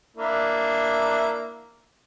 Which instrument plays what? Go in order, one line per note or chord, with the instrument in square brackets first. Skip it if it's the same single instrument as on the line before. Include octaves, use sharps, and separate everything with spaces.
[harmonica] A#3 D4 E4